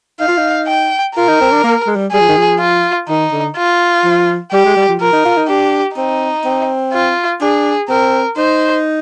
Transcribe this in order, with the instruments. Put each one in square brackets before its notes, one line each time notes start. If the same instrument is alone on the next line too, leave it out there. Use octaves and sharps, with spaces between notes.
[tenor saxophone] D#4 [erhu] F5
[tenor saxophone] F4
D#4
[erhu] G5
[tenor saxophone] F4 [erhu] A#4
[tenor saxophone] D#4
C4
D4
A#3
G#3
G3
[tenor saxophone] G3 [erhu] G#4
[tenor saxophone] F3
D#3
F3
[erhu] F4
[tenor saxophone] D#3 [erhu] D#4
[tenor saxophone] D3
[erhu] F4
[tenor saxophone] F3
[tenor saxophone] G3 [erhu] G4
[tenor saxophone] G#3
G3
F3
[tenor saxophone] F3 [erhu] A#4
[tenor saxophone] D#4
F4
D#4
[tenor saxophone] D4 [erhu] G4
[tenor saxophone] C4 [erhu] D#4
[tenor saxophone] C4
[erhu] F4
[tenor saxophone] D4 [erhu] G#4
[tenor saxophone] C4 [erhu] A#4
[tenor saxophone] D#4 [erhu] C5